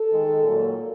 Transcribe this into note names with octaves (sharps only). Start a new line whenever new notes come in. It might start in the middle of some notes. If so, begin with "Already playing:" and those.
Already playing: A4
D#3 G#3
A#2 F#3 A#3